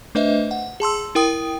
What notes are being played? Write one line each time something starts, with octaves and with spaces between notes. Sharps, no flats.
A3 D4 B4 C5 D#5 E5
F#5
G#4 A5 C6 E6
E4 A#4 G5 D#6